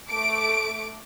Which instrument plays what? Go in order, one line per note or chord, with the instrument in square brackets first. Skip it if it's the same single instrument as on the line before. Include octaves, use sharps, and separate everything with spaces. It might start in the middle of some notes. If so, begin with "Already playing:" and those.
[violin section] A3 D6 D7